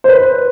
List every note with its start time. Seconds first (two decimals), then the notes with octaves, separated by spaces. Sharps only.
0.04 C5
0.08 B4